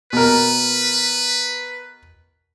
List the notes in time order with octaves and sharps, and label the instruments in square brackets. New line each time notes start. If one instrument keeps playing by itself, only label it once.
[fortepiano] B2 A#4 [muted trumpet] B4